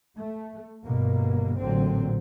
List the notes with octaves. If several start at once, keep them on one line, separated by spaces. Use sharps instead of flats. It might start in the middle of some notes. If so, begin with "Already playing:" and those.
A3
G1 G2 B2 A#3
A1 A#2 D3 F#3 C4